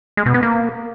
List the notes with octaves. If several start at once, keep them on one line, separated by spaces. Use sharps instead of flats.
G#3
B2
B3
A#3